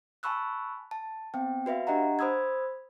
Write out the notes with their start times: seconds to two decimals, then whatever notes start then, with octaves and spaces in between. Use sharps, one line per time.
0.23 G#5 A5 B5 C#6 E6 F#6
0.91 A5
1.34 B3 C4 G5
1.66 F#4 B4 E5 F5
1.87 D4 G4 D#5 F#5 A#5
2.19 C5 B5 D#6 E6 G#6